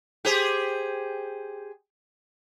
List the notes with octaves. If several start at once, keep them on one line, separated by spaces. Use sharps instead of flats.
G4 G#4 C5